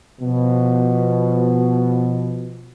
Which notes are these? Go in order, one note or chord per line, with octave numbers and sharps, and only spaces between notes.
B2 F3